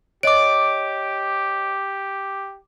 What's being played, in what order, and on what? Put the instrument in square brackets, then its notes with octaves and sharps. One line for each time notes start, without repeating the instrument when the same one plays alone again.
[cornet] G4 [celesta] C#5 D#5 [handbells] D6 D7